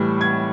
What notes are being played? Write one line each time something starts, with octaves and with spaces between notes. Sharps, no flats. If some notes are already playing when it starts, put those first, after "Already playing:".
Already playing: A2 E3 G3
G#6